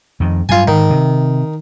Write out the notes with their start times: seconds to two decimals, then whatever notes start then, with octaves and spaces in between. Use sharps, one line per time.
0.20 F2 D#3
0.49 G2 F#3 F4 G#5
0.68 G#2 D#3
0.90 C3